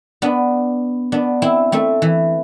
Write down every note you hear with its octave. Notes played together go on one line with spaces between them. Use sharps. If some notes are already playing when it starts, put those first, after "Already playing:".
B3 D4
B3 D4
C4 E4
A3 C4
E3